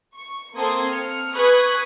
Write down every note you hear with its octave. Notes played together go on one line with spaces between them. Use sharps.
C#6
A#3 C4 A4 C6 D#6 G#6
F6 C#7
G#4 B4 C#6 D#6 F#6 G#6